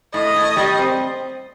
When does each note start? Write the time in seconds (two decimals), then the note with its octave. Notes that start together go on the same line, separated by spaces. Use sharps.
0.14 A2 D#5
0.36 A2
0.57 G3
0.79 C4